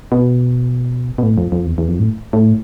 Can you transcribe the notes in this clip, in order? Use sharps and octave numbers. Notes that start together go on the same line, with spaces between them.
B2
B2
A2
F2
F2
E2
E2
F2
A2
A2